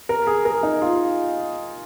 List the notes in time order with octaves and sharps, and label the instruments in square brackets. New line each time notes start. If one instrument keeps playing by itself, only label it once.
[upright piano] A#4
G#4
A#4
D#4
F4